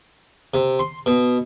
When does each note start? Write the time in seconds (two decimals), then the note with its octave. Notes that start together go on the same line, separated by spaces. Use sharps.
0.54 C3
0.79 C6
1.06 B2